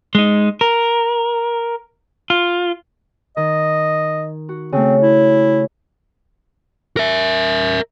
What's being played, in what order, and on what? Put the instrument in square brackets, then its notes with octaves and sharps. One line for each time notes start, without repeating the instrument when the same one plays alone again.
[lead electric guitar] G#3 D#4
A#4
F4
[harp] D#3 [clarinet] D#5
[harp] F#4
[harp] C#3 A3 [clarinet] C4
[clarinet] E4
[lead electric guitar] A#4 E5